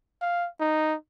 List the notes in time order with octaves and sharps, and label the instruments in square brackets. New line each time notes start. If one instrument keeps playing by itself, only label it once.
[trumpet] F5
D#4